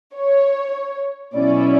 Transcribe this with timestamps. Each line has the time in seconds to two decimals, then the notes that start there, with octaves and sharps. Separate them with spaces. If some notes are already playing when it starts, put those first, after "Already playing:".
0.14 C#5
1.34 B2 F#3 C#4 E4 D5